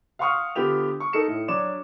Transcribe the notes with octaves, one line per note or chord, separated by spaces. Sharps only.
F5 F#5 C6 C#6 D#6 F6
D3 B3 F4 G4 F7
C#6
D#4 A4 A#4 C#7 E7
A2
F#3 D4 C#5 D6 E7